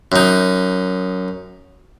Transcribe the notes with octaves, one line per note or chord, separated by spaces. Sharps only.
F#2 D#4